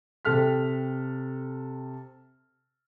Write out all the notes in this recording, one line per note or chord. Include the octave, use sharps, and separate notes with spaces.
C3 G4 A4 F6 B6